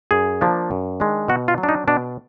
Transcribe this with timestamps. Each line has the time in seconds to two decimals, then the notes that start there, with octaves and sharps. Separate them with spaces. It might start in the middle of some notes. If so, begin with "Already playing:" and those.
0.11 F#2 G#4
0.41 F3 A#3 D4
0.71 F#2
1.00 D#3 G#3 D4
1.28 B2 F#4
1.48 F4
1.58 F#3
1.63 D4
1.69 D#4
1.87 B2 D4